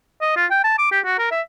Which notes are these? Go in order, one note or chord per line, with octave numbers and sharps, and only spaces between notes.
D#5
F4
G5
A5
D6
G4
F#4
A#4
E5